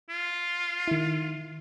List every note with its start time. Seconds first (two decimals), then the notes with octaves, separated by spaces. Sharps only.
0.09 F4
0.88 D#3 E4